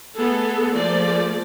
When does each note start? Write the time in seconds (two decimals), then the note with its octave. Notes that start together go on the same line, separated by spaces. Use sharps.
0.15 A3 B3 G#4 A4
0.74 F3 A3 A#3 G#4 D5